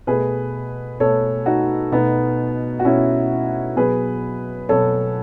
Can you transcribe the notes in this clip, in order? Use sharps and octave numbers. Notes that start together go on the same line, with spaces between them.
B2 A3 G#4 B4
B2 A3 A4 C#5
D#4 F#4
B2 A3 B3 D#4
F#4
B2 A3 C#4 E4
B2 F#3 B3 G#4 B4
B2 F#3 B3 A4 C#5